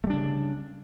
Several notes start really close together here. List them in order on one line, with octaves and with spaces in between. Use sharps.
A3 G3 D4 C#3